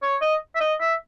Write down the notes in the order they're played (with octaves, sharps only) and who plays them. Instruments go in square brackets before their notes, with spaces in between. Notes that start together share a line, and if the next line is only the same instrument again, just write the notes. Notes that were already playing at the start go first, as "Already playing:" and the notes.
[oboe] C#5
D#5
E5
D#5
E5